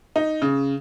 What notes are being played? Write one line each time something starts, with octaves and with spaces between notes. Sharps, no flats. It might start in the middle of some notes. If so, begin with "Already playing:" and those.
D#4
C#3